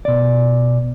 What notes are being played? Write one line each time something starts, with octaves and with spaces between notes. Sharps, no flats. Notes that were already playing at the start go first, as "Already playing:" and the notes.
B2 D5